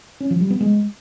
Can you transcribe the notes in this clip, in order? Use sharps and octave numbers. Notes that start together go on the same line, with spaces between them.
C#4
F3
G3
B3
G#3